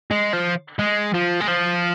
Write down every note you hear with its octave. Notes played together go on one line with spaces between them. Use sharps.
G#3
F3
G#3
F3
G#3
F3